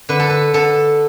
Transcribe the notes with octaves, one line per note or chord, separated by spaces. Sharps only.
D3 B4
A4
B4
D3 A4